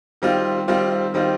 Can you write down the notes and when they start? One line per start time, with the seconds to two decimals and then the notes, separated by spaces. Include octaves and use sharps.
0.22 D#3 G3 C4 F4
0.68 D#3 G3 C4 F4
1.14 D#3 G3 C4 F4